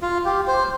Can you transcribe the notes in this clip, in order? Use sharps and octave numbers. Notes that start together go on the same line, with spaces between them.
F4
G4
C5